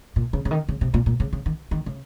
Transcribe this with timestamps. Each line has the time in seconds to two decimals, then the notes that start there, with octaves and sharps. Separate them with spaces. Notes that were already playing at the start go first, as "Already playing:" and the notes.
0.16 A#2
0.33 C#3
0.45 C#3
0.51 D#3
0.69 C#3
0.81 C3
0.94 A#2
1.06 A#2
1.20 C#3
1.33 C#3
1.46 D#3
1.71 D#3
1.86 C#3